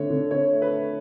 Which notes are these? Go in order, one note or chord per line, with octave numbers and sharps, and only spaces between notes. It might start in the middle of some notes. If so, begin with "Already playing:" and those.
Already playing: D3 A3 C#5
D3
D3 C#5
A3
B4
A3